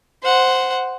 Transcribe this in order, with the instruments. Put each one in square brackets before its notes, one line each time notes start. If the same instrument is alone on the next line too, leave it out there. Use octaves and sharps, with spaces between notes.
[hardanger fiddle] C5 F#5